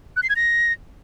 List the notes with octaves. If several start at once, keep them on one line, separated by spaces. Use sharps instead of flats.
F#6
C7
G#6
A#6